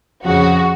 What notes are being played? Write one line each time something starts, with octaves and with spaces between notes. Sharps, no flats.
F2 C#3 F3 F#4